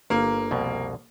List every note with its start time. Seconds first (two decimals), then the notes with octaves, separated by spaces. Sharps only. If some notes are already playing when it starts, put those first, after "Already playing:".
0.10 G1 A#3
0.51 C2 F2 B2